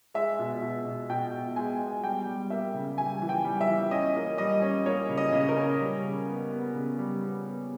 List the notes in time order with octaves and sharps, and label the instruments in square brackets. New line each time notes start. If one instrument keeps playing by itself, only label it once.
[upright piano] G#3 E5
B2
B2
B2
B2 G5
B2
G#3 G#5
B3
G3 G5
G3
A#3 E5
C#3
G3 G#5
E3
G5
G3
E5
E3
C#4 D#5
A#3
G3 D#5
C#4
A#3 C#5
C#3
D#5
C#3
A#4
C#4
G3
C#3
B3
B3
C#3
G3
B3
B3